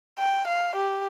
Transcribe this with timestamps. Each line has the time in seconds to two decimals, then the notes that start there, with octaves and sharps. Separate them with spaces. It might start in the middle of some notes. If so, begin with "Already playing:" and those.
0.19 G5
0.48 F5
0.76 G4